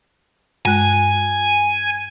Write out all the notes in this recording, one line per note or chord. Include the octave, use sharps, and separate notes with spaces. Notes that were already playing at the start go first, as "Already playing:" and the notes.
G2 G#3 G#5 F#6